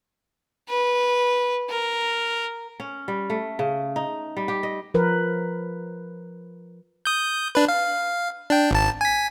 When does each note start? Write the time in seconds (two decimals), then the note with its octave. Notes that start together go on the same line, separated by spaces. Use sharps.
0.69 B4
1.70 A#4
2.80 C#4
3.08 G3
3.30 A3
3.59 C#3
3.96 D#4
4.37 G3
4.48 G4
4.63 D#5
4.94 F3 A#4 B4
7.05 D#6 G6
7.55 D4 B4
7.68 F5
8.50 D4 G5
8.71 G#1 A5
9.01 G#5 B6